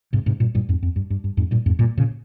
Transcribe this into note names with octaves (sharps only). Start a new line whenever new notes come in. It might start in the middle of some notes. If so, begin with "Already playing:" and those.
G#2 C3
G#2 C3
G2 A#2
G2 A#2
F2 G#2
F2
G2
G2
G2
F2 G#2
G2 A#2
F2 G#2
G2 A#2
A#2 C#3